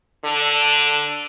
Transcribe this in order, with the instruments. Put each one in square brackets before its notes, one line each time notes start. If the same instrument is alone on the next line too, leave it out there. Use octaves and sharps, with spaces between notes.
[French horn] D3